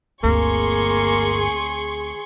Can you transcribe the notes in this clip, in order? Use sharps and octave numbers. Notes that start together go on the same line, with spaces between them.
G1 D2 A#3 C4 G#4 C6 C#6